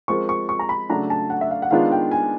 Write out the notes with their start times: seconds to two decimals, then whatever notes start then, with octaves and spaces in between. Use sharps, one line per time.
0.08 F3 G#3 C4 F4 A#4 C#6
0.29 C#6
0.49 C#6
0.59 A#5
0.69 B5
0.89 C#3 F#3 A3 D4 A#5
1.10 A5
1.30 F#5
1.41 E5
1.51 F5
1.62 F#5
1.71 D#3 G#3 B3 D4 F4 F5
1.92 G5
2.11 G#5